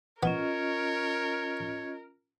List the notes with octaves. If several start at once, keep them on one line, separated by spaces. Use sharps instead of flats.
B3 C#4 F4 A#4 C#5 D#5